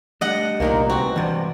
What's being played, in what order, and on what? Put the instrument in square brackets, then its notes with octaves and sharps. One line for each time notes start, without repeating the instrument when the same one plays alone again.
[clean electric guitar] G3 A3 D4 [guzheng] D#5 F#5
[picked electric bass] C2 [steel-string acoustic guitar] A#2 D#3 A#3
[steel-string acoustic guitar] E3 C4 [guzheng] F#4
[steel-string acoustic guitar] G2 C3 [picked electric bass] E3 G3 [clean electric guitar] G#3 D5